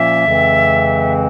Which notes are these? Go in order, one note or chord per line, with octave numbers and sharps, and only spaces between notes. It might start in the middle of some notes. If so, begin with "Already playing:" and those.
Already playing: A#2 F3 A#3 C#4 E5
F2 C#3 E3 G#3 C4